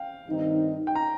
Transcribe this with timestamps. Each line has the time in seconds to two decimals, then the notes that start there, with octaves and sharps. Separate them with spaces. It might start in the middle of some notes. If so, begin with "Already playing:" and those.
Already playing: F5 G5
0.26 G2 D#3 C4 D#4
0.87 G5
0.95 A#5